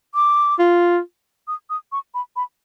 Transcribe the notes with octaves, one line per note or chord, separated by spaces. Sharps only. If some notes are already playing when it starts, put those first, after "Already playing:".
D6
F4
D#6
D#6
C#6
B5
B5